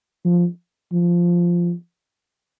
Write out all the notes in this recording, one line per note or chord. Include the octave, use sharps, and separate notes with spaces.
F3
F3